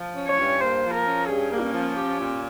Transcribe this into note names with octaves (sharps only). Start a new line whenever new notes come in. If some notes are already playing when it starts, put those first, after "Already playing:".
Already playing: F3
C#4
C#5
G2
A#3 C5
F3
A#4
C#4
G2 G#4
A#3
C#4
F3
G4
A#2